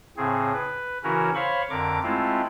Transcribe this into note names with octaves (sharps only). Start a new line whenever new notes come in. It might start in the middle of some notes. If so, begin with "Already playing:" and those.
A2 C#3 C4 G#4
B4
C#3 E3 C#4 E4 F#4 A#4
C5 C#5 F5 B5 C#6
F2 D3 A#4 D6
G#3 A3 C4 E4 F4